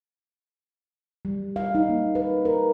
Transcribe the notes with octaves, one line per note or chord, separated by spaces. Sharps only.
G3
F5
D#4
A#3
B4
A#4